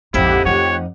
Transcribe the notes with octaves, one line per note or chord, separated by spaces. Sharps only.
A#1 F2 G#2 D#4 E4 G4 D#5 F#5
F3 A3 C#5